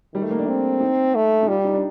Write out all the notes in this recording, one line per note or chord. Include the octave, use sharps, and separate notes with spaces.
D#3 G3
A3
A#3
D4
C4
D#4
A3
D#4
G3 F4
G4
D#4
D4